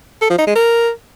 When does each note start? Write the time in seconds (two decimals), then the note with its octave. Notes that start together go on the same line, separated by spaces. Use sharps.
0.22 A4
0.30 F3
0.39 D#4
0.47 G#3
0.56 A#4